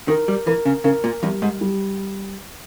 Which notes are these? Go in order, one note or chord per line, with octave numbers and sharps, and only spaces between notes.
D#3 A#4
G3
E3 A#4
C#3
C#3 A#4
A#2
E2 G3
G#2
G3